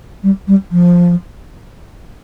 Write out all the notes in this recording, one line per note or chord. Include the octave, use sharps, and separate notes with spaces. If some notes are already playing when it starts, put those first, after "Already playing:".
G3
G3
F3